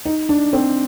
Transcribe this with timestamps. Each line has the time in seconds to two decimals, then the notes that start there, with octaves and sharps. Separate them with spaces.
0.05 D#4
0.29 D4
0.53 C4